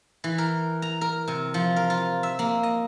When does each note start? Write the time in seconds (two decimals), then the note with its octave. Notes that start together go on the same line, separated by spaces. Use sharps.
0.24 E3
0.38 A#4
0.82 A#5
1.01 A#4
1.28 C3
1.54 F3
1.76 A#4
1.90 F4
2.23 E5
2.39 A#3
2.63 D#5